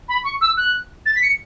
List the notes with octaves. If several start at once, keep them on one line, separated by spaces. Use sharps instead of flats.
B5
C#6
E6
F#6
A6
B6
C#7